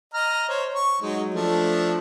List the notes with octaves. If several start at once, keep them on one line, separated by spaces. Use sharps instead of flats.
D#5 A#5 F6
C5 C#5
C#6
F#3 G#3 D#4
F3 A3 D4